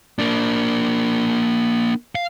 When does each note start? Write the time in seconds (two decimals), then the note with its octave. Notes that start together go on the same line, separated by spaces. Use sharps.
0.19 A#3 D4
2.15 F5